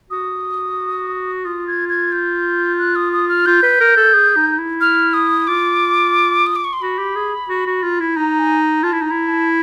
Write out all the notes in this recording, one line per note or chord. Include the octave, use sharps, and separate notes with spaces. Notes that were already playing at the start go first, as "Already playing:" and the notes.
F#4 D#6
F4 D#6
G#6
G#6
G6
F#6
D#6
D#6
F6
F4 G6
B4
A#4
A4
G#4
D#4
E4
F6
D#6
F4 D6
D#6
D6
C#6
C6
F#4 B5
G4
G#4
F#4
F#4
F4
E4
D#4 A#5
G#5
F4 A5
E4
D#4
E4 A#5
A5